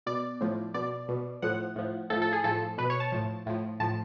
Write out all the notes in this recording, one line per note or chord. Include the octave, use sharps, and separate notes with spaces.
B2 D5
A2 F3
B2 D5
B2
A2 F3 F#5
A2 F3
A2 F3 A4
A4
G#4
A2 F3 A4
B2 B4
C#5
A5
A2 F3
A2 F3
A2 F3 A5